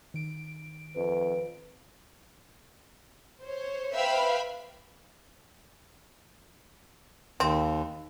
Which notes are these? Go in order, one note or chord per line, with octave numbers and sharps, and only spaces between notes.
D#3 D7
F2 B4
C5 C#5
B4 C5 E5 F5 G5 B5
D#2 C4